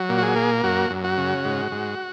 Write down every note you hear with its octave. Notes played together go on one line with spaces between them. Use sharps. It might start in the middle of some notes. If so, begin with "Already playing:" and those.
Already playing: F#3
A#2
F#4
G#4
A#3
F#2 F#4
F#2
F#4
C#3
G#2
G#2